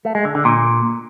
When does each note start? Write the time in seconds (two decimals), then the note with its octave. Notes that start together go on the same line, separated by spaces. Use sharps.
0.05 A3
0.15 G#3
0.25 D3
0.35 D3
0.45 A#2